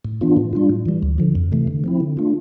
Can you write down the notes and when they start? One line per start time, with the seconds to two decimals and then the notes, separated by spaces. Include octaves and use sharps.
0.05 A2
0.21 E3 B3 D4 F4
0.37 A2
0.53 G3 D4 F4
0.69 A2
0.86 E3 G3
1.03 D2
1.18 D3 F3
1.35 F2
1.52 C3 E3 A3
1.67 D3
1.84 F3 C4 E4
2.00 D3
2.17 A3 D4 F4